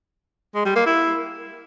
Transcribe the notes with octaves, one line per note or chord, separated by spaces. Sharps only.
G#3
G3
A#3
E4